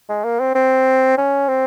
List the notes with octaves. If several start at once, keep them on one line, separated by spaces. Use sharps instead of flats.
G#3
A#3
C4
C4
C#4
C4